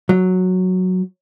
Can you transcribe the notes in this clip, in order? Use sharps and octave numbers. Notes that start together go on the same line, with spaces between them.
F#3